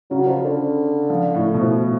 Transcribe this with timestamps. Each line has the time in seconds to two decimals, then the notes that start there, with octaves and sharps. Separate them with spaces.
0.11 C#3 F#3
0.27 F3
0.44 D3
1.10 F3
1.35 A2
1.54 B2
1.60 A2 F3